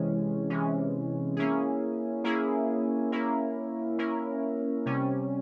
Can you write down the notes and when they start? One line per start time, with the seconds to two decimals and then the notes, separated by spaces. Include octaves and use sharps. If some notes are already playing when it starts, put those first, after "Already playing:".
Already playing: C3 E3 G#3 C#4
0.50 C3 E3 G#3 C#4
1.36 A#3 C#4 E4 G#4
2.24 A#3 C#4 E4 G#4
3.12 A#3 C#4 E4 A#4
3.98 A#3 C#4 E4 A#4
4.86 C3 G3 C#4